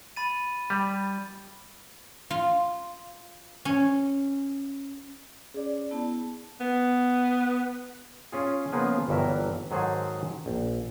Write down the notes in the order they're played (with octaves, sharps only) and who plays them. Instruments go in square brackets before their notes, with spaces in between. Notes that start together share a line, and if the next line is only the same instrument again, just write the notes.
[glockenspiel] B5 A6 D#7
[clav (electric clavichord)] G3
[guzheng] F4
C#4
[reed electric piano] C#4 D5 [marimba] G#4
[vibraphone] B3 E4 A5
[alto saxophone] B3
[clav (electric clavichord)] C#4 F4 G#4
C#3 F3 A#3 B3 F4 G#4
G1 G2 E3 F#3 A#4 E5
G#2 D#3 F#3 G#4 A4 C5
A#1